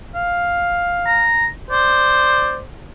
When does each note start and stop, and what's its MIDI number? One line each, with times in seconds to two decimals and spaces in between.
0.15 1.26 77
1.06 1.47 82
1.71 2.62 72
1.71 2.57 74